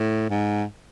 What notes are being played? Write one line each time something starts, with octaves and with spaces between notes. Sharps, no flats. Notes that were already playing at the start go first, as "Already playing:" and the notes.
Already playing: A2
G#2